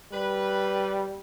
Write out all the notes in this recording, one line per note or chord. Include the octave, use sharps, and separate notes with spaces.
G3 B4